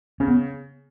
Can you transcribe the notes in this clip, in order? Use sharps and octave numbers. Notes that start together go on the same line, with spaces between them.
C#3 C#4
B3